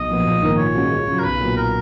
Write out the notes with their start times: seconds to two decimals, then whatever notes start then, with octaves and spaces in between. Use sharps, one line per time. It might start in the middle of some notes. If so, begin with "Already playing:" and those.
Already playing: B1 D#5
0.08 A#2 F3 B3
0.25 A#1
0.41 G#2 D#3 A#3
0.57 A#2 C#5
0.75 G#3 C#4 F#4
0.91 C#2
1.07 C#3 F#3
1.19 A#4
1.23 B1 B4
1.41 A#2 F#3 B3
1.56 A#4